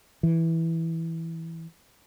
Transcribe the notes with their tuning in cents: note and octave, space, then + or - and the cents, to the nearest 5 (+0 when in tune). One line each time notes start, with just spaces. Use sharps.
E3 -5